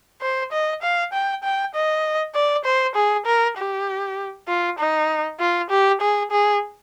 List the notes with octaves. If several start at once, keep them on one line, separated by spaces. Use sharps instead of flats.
C5
D#5
F5
G5
G5
D#5
D5
C5
G#4
A#4
G4
F4
D#4
F4
G4
G#4
G#4